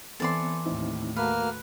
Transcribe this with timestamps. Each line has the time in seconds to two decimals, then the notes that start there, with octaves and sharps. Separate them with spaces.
0.20 E3 B3 C4 A4 D5 C6
0.66 D#2 A2 C4 D#4 E4
1.16 A3 A#3 F#4 A4 B4 F6